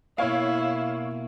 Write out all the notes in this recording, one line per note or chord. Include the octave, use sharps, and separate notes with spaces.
B2 A#3 E4 C#5 F5